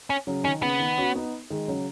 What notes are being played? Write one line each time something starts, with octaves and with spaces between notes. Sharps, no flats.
C#4
C#3 F#3
D#3 C#4
C#3 B3
D#3
C#4 F#4
B3 D#4
D#3 G#3
C#3 F#3